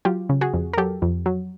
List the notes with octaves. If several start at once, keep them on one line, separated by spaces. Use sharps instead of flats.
F#3 F4 G4
C#3
F#4 G#4
F2
A#4
F#3 G4 A4
F2
F#3